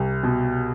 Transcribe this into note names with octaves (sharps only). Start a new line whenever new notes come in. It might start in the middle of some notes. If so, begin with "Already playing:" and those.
Already playing: C2
B2